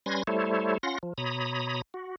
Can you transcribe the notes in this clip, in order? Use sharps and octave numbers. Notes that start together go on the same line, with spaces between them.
G3 C#4 B4 C6 G#6 A#6
G3 A3 E4 A4 C5 C#5
C#4 F4 F#5 C6 A#6
F3
B2 C#5 A#5 B5 D#6
F#4